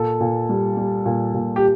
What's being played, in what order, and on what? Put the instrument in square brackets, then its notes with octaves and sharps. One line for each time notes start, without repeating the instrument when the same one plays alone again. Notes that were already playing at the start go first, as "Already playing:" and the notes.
Already playing: [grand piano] A#2 A4
A#2
G3
G3
A#2
A#2
G4